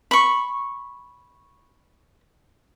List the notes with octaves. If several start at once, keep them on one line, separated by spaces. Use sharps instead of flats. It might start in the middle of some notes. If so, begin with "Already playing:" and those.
B5 C#6